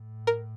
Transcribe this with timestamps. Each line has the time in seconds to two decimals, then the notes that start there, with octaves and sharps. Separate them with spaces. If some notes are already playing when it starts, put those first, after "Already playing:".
Already playing: A2
0.27 A#4